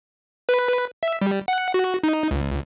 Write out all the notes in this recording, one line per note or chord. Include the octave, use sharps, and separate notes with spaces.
B4
E5
G3
F#5
F#4
D#4
C#2